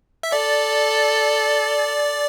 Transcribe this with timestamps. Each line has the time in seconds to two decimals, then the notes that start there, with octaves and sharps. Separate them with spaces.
0.23 E5
0.32 A4 D5